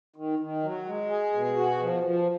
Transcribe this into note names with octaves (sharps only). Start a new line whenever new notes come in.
D#3
D#3
F#3
G#3
G#4
B2
F#4
F3
F3